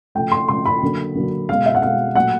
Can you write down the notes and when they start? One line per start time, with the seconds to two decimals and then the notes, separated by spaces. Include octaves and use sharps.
0.15 C#3 F3 A3 G5
0.32 C6
0.48 C#3 F3 A3 C6
0.66 B5
0.82 D3 F#3 A#3
1.15 D3 F#3 A#3
1.49 B2 G#3 F5
1.66 E5
1.75 F#5
1.82 B2 G#3 F5
2.15 A#2 F#3 A3 F#5